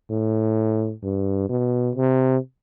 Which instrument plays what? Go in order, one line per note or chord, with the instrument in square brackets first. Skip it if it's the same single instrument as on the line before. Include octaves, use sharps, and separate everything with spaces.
[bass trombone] A2
G2
B2
C3